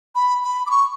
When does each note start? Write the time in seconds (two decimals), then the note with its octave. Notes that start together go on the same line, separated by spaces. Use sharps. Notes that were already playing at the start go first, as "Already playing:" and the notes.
0.15 B5
0.44 B5
0.66 D6
0.71 C#6